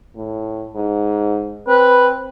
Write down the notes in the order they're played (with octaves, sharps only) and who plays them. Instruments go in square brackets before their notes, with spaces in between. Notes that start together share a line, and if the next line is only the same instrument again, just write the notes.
[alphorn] A2
G#2
[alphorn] C4 [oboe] B4